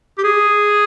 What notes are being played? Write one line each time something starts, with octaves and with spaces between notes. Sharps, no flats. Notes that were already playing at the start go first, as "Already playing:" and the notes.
G4
G#4